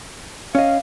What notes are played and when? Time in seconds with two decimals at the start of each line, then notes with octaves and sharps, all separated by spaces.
0.55 C#4 D#5 F5